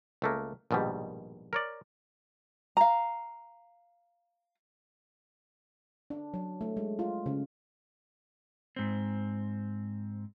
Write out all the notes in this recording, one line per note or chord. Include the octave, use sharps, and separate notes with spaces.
C#2 A3 A#3
A#1 G#2 B2 D#3 G3
A#4 C#5 D5
F5 A#5
D4
F#3
A3
G#3
F4
C#3
G#2 C4